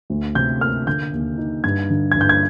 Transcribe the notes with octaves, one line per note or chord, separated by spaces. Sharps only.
D2
C3 G6
A#3 F6
D3 G6
D#2
D#4
G2 G#6
D3
G2 G#6
G6
G#6